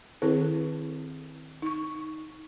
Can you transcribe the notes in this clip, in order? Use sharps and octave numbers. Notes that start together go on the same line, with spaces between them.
D#3 C4 E4 G#4 A4 B4
D#4 C#6